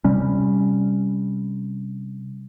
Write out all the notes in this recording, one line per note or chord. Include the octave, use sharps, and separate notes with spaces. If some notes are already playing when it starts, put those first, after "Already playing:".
C3 G3 C#4